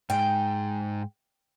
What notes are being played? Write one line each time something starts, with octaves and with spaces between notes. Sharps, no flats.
G#2 G#3 G5